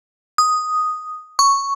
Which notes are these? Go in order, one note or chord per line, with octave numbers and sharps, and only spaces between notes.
D#6
C#6